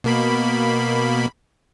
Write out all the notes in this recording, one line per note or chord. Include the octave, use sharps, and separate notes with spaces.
B2 A#3 B5